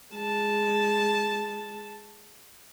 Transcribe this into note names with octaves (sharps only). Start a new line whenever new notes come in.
G#3 A5